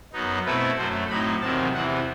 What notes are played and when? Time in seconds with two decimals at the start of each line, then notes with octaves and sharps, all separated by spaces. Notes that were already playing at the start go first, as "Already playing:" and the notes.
0.13 F#2 F#3 B3 D#4
0.45 B2 A3 C4 E4 B4
0.78 F#2 F#3 A3 C5
1.10 A2 F#3 C4 D#4 B5
1.42 E2 C3 D#3 F#3 C4 A5
1.74 E2 C3 E3 F#5